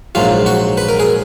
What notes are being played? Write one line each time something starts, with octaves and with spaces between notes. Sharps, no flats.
A#1 G#2 F#3 F4
F#4
B4
A#4
G#4